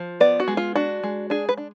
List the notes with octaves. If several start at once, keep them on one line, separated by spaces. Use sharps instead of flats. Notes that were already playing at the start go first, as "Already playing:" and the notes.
Already playing: F3
B3 D5
F#4
G#3
F4
D4 F#4
G#3
D4 G#4
B4
D4